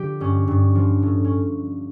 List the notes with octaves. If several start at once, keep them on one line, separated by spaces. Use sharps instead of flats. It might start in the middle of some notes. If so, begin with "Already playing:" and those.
Already playing: D3 F3 G4
G2 C#4
G2
F3
A2
C#4